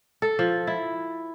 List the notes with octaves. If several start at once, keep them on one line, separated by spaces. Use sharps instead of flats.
A4
F3
E4